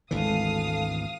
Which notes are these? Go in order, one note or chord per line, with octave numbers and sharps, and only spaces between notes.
G#1 D2 E3 G#3 A4 F5 A5 D#6